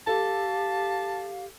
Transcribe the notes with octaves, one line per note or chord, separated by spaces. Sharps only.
G4 A4 F5 A5